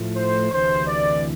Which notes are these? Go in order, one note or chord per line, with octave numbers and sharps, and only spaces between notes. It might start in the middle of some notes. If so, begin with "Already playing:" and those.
Already playing: A2 F3 A3
C5
D2 C3 E3 C5
D5